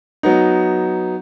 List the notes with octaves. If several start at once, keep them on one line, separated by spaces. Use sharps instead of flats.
F#3 B3 D#4